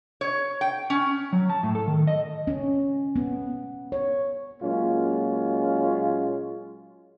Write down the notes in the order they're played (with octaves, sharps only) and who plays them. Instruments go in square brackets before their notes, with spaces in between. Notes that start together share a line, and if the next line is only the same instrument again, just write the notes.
[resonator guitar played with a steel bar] C#5
G5
C#4
[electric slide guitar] F#3
A5
A2
A4
D#3
D#5
[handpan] C#4
B3
C#5
[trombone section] A#2 F#3 G#3 A#3 C#4 F4